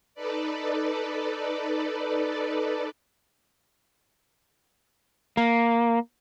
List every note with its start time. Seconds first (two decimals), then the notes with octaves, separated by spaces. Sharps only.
0.15 D#4 A4 B4 D5
5.37 A#3